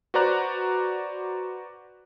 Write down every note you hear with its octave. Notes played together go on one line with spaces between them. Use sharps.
F#4 B4 C5 D5 A#5 F#6